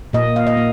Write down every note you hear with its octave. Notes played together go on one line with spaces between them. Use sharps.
A#2 A#3 D#5
F5
D#5
A#3